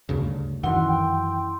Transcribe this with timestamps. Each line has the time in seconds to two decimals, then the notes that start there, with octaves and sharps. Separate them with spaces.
0.09 D2 G2 C#3
0.64 F#2 D#3 E3 E4 F#5 C6
0.88 G5